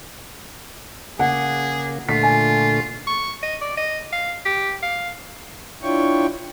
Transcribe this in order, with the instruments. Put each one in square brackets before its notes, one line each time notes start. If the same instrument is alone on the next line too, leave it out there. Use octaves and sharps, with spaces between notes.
[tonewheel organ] C#3 A#3 [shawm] G#4 [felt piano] F#5
[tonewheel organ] A#2 D3 A3 [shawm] F4 [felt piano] B6
[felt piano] G#5
[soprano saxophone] C#6
D#5
D5
D#5
F5
G4
F5
[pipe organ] D4 E4 F4 C#5 G5 C#6